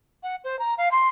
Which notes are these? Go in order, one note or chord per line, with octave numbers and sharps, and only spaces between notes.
F#5
C5
A#5
F5
C6